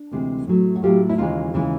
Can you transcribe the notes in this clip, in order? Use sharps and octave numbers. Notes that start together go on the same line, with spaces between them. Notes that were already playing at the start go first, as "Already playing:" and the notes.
Already playing: D4
D2 C3 E3 G#3
A2 F#3 A3
F#4
A2 F#3 A3 F4 G4
E4
D#2 C#3 E3 G#3 D#4 F4
D#2 C#3 E3 G#3